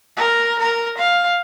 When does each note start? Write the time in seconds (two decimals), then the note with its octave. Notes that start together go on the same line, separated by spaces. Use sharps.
0.17 A#4
0.59 A#4
0.98 F5